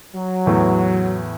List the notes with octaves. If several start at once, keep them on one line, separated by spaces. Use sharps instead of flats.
F#3
E2 A2 E3